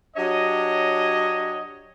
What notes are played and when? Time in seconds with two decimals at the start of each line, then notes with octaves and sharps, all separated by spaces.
0.17 F#3 D4 G4 C#5 D#5